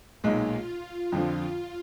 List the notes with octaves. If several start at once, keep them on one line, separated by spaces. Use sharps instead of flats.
B1 A#2 G#3 D#4 F4
F2 D3 F3